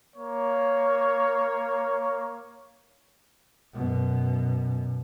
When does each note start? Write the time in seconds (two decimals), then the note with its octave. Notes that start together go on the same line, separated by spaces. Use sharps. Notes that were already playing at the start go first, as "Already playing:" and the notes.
0.16 A#3 C#5
3.74 F#2 B2